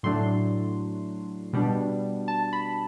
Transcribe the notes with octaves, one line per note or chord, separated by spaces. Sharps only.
A2 F#3 A3 D4 C6
B2 G3 D4
A5
B5